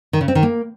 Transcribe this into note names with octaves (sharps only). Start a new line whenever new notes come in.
D#3
C#3
C4
D#3
A#3